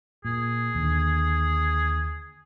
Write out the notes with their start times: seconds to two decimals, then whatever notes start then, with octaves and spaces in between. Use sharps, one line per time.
0.25 A#2 G#4
0.75 D#2 D3